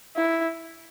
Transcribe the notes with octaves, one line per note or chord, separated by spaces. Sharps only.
E4